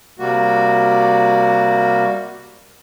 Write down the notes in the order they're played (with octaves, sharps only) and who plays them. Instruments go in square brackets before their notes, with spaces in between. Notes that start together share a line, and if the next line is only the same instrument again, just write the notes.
[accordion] C3 G3 A#3 F#4